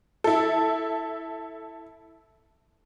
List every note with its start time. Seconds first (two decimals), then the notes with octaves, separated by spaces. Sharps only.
0.24 E4 A4